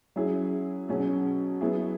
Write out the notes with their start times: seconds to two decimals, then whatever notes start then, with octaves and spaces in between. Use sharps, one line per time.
0.16 F#3 C#4 E4 G#4
0.89 B2 F#3 C#4 G#4
1.61 F#3 B3 E4 G#4